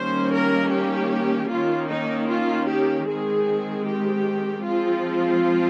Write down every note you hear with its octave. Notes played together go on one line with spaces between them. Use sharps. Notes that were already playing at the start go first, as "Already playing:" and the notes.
Already playing: D#3 G3 A#3 C#4 C5
A#4
G4
D#3 A#3 C#4 F4
D#4
F4
G4
D#3 G#3 C4 G#4
G4
F3 G#3 C4 F4